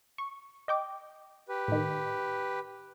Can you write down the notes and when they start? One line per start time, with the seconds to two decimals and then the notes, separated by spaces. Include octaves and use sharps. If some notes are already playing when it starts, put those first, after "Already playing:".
0.18 C#6
0.68 D#5 G5 D6
1.49 G4 B4
1.68 A2 D#3